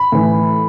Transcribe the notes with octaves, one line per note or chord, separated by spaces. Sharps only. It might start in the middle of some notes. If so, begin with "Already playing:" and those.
Already playing: B5
A2 E3